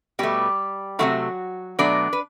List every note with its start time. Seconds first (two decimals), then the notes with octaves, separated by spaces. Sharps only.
0.19 B2 G3 A3 G4
0.99 C3 E3 F#3 A3 F#4
1.79 B2 F#3 A3 D4 D5
2.13 B4